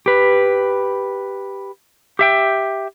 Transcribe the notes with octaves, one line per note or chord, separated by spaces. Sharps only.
G4 B4
G4 E5 G5